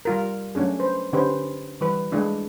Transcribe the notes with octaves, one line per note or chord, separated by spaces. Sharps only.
G3 F4 A#4
F#3 A3 C#4 D4 G#4
B4 C5
D3 C#4 G4 B4 C5
E3 G3 B4
G#3 A3 D4 E4